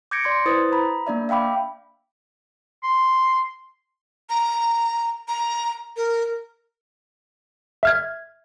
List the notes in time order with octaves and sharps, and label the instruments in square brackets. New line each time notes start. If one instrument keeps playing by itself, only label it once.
[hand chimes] D6 G6 G#6 A#6 C#7 D7
D5 C6 G#6
E4 B4 C5 D#6 A6
A#5 B5
A#3 D4 D5 E5
E5 F5 G5 B5 D6
[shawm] C6
[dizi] A#5
A#5
A#4
[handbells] E5 F6 G#6